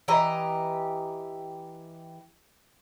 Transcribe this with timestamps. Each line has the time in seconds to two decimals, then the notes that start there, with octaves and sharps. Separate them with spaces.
0.08 E3 G4 D#5 A#5